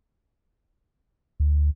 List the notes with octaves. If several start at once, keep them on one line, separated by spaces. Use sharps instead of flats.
D2